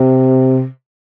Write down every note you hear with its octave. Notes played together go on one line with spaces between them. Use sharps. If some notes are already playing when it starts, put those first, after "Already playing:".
Already playing: C3